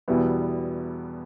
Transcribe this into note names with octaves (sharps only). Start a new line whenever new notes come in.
E2 B2 G3 B3 E4